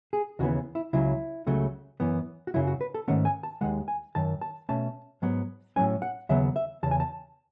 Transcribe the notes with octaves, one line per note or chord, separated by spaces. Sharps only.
G#4
D#2 C#3 E3 B3 F#4
E4
C#2 C#3 F#3 E4
C#2 C#3 F#3 A3
F#2 E3 B3
F#4
F#2 C#3 F#3 E4
F#4
B4
A4
G#2 D#3 A3 C#4 F#5
G#5
A5
D#2 D#3 G#3 F#5
G#5
F#2 D#3 A5
A5
B2 A3 C#4 A5
G#2 F#3 B3
A2 F#3 A3 C#4 G#5
F#5
D#2 C#3 F#3 B3 E5
E5
E2 C#3 A5
G#5
A5